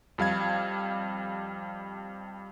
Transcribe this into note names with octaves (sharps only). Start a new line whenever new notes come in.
F2 G3 F5 G#6